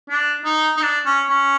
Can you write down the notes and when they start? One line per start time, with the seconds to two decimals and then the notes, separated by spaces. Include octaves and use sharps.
0.10 D4
0.45 D#4
0.77 D#4
0.82 D4
1.06 C#4
1.30 C#4